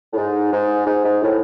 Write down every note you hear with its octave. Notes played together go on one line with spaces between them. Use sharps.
A2
G#2
G#2
G#2
G#2
A2